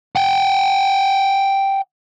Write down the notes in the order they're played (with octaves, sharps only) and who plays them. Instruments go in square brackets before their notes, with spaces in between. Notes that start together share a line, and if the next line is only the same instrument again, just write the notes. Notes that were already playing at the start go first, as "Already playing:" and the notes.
[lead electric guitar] F#5 G5